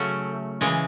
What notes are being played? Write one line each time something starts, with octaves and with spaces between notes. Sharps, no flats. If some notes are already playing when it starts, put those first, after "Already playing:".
Already playing: C#3 F#3 A3 C#4
C#3 E3 G#3